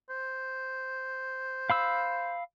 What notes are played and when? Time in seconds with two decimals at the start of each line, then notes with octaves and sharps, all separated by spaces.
0.10 C5
1.70 F5 B5 E6